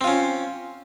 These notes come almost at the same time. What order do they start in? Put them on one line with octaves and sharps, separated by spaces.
C4 F4 C#4